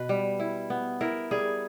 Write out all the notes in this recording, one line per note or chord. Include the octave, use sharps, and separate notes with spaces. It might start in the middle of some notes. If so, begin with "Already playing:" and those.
Already playing: B2 B4
G3
E4
B3
E4 A#4
G3 G#4